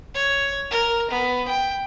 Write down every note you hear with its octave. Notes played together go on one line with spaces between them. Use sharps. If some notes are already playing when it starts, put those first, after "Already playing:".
C#5
A#4
B3
G5